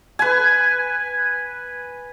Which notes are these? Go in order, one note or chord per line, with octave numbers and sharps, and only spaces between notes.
B4 G#5